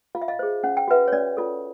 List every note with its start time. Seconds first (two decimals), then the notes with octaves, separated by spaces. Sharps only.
0.15 F4 F5
0.22 E5
0.28 D#5 F5
0.39 G#4 C5
0.64 C#4 F#5
0.77 G5
0.88 F#4 B4 E5 F#5
1.08 C#5
1.12 C#4 D5
1.37 F4 A4